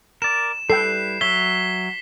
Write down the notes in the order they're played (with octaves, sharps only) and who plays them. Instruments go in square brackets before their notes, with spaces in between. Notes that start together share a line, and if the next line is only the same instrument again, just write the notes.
[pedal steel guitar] A#4 D5 [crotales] E7
[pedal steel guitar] G3 E4 B4 [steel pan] A4 G5 [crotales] C7
[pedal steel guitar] F#3 C#5 E5 [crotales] B6 G7